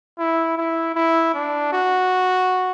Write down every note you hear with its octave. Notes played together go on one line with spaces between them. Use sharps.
E4
E4
E4
D4
F#4